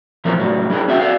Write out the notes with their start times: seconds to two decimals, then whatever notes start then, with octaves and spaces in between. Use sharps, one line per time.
0.25 A#2 E3 F3 C#4 E4 A#4
0.38 A2 F#3 G3
0.70 G3 D4 F#4 G#4 A#4
0.88 C#4 F#4 E5 F5 G5
0.99 F#4 A4 D5 F5